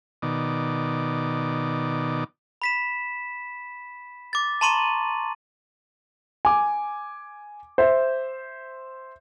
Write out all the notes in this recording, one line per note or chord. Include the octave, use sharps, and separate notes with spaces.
B2 D#3 D5
B5 B6 E7
D6 A6
A5 A#5 C6 C#6 D#7 F#7
G#5 D6
C5 E5